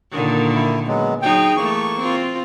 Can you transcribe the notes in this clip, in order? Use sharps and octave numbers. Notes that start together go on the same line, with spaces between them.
A#2 D3 D#3
E4
F#3 G#3 B3
F#3 D#4 G#4 G5
E3 A3 A#3 C#6
C4 F4